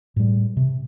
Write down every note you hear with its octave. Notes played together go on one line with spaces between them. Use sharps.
A2 G3
C3